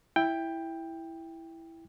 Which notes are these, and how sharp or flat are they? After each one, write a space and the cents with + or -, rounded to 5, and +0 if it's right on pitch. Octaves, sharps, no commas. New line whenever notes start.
E4 +0 G5 +10